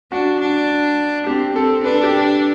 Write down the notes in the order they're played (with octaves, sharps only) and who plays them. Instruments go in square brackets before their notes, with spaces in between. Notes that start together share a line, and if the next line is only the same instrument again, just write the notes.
[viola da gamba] D4 [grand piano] F#4
[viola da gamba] D4
[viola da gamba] C4 [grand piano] G4
[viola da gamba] C4 [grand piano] A4
[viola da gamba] D4 [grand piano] B4
[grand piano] A4
G4